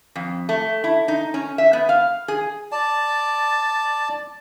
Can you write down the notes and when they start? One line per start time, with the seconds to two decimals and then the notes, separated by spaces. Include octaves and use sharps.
0.16 F2
0.49 A3
0.84 E4
1.08 D#4
1.34 C#4
1.58 E5
1.73 B3
1.89 F5
2.28 G#4
2.72 D5 A5